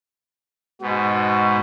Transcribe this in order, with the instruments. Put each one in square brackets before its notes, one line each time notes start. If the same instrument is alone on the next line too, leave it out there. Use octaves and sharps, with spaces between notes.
[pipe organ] G#2 B2 [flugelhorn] F#4